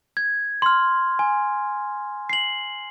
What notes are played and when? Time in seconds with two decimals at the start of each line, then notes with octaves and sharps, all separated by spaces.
0.17 G#6
0.62 C6 F6
1.19 G#5
2.29 C7 F#7